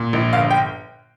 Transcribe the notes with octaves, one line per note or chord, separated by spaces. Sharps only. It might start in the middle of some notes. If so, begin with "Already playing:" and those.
Already playing: A#2
A#1
G1 F5
G5